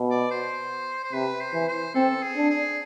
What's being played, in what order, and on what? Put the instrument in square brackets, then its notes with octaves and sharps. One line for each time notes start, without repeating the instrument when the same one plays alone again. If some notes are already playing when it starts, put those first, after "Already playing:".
Already playing: [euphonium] B2
[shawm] D5
C5
C5
[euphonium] C3 [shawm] B4
[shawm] C5
[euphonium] E3
[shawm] C5
[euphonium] C4 [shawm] A4
[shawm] G#4
[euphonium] D4
[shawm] G#4